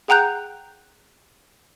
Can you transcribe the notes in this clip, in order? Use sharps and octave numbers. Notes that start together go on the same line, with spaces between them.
G#4 F#5 G5 A#5 F#6 G6